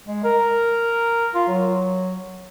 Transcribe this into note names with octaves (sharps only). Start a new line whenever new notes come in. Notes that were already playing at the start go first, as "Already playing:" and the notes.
G#3
A#4
F4
F#3